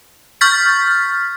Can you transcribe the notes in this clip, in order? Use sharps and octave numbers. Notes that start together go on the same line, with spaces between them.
C#6 F6 G6 A6 B6